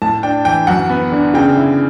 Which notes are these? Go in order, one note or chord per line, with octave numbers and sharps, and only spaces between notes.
A2 A5
D4 G5
E3 G5
F#2 F#5
B3
D3
C#3 G5
E4